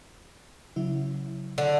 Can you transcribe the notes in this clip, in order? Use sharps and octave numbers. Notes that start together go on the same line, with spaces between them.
C#3 F#3 E4
D3